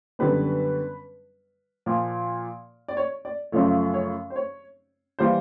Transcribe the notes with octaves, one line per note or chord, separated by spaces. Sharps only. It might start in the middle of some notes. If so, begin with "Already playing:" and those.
F#2 D3 G3 B3 B4
A#2 F3 A#3
D5
C#5
D5
F#2 C#3 F3 A3 C#5
C#5
C5
C#5
E3 G3 A#3 C5